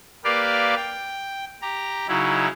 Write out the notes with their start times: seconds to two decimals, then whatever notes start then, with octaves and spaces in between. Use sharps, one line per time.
0.24 A#3 G4 B4 D5 F5
0.77 G5
1.62 G4 A#5
2.08 C#3 F#3 D#4 E4